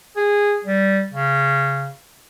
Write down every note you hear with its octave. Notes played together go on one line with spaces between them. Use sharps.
G#4
G3
C#3